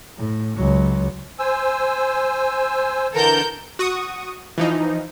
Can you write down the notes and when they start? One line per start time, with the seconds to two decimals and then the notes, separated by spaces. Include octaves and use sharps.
0.17 A2
0.56 C#2 F#3
1.39 C5 G#5 E6
3.14 D3 E3 A4 A#4 G6
3.79 F#4 C#6 D#6
4.58 E3 F3 D#4